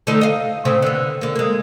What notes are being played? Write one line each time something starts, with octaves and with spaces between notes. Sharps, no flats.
D3 A3 D#4
D#5 F5
A2 C#3 C4
D3 B3
D3 A#3
G#3 A#3